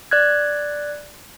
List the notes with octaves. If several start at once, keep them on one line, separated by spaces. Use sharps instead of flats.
D5 F#6 G#6